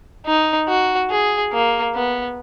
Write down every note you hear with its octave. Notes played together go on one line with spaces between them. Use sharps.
D#4
F#4
G#4
A#3
B3